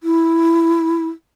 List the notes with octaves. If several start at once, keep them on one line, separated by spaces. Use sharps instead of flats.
E4